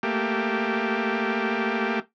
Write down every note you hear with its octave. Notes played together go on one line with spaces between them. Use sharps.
A3 A#3 G4